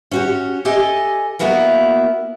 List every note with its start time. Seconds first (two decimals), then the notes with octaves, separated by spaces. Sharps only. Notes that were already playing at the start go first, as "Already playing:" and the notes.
0.11 C#4 F#4 G4
0.65 G4 A4 D#5 G#5
1.39 A#3 B3 E4 F#4 A#4 B4